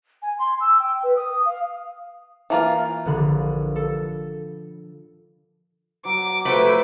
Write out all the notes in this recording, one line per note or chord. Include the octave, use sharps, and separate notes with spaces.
G#5
C6
E6
G5
B4
D#6
F5
E3 A#3 F4
A#1 D3 B5
A4
F#3 D6
F3 F#3 A3 E4 B4 C5